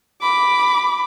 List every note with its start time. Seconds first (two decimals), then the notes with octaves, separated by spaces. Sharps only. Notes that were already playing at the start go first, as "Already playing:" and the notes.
0.22 B5 D6